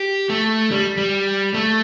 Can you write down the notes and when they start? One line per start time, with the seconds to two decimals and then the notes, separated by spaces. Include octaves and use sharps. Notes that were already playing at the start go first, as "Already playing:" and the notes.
Already playing: G4
0.30 A3
0.71 G3
0.97 G3
1.54 A3